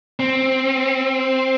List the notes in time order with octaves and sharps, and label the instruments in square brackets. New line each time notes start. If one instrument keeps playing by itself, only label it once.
[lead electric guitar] C4